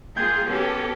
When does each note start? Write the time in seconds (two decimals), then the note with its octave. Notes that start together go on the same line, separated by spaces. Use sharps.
0.16 A#3 F4 G#4 G5 G6 G#6
0.46 B3 C#4 G4 A4